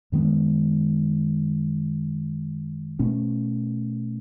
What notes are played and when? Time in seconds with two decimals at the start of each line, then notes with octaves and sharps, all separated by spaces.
0.12 F#2 D#3 G#3 B3
2.99 B2 A3 C#4